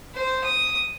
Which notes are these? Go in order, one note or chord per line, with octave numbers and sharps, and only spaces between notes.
C5
D#6